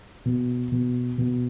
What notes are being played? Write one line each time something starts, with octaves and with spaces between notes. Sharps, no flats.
B2
B2
B2